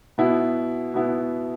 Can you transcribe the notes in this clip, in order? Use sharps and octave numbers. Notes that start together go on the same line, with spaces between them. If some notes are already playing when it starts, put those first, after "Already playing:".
B2 B3 E4
B2 B3 E4